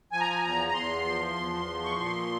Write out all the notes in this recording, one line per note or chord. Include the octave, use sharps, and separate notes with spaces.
F3 G#5
A#5
G#5
E2 A#5
A#5
E2 C6
F3
E2
F3
C#6
A#2 C6